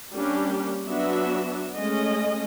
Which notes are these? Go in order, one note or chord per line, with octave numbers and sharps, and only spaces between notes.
G3 A#3 C#4 D4 G4
F#3 B3 D4 F#4 E5
G#3 A3 C#4 D#5